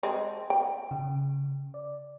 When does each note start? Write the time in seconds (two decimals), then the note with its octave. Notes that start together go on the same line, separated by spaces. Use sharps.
0.03 G#3 C4 A5
0.50 G5
0.91 C#3
1.74 D5